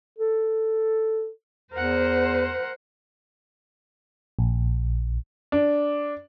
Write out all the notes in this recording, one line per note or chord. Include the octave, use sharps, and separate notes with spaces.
A4
E2 A#4 C5 F#5
A#1
D4